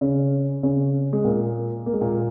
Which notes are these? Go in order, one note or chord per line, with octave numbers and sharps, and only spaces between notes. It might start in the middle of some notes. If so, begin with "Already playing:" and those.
C#3 C#4
C#3 C#4
G#3
A#2 A#3
A#3
G#3
A#2 A#3